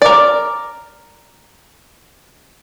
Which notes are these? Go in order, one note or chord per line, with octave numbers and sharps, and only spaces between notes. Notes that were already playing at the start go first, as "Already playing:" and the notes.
A#4 D5